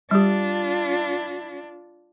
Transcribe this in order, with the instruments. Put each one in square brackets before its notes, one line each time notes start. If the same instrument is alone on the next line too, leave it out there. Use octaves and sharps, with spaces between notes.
[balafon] G3 G4 [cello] D4 F4